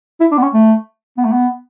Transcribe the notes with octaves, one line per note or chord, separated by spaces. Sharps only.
E4
D4
B3
C#4
A3
B3
A3
B3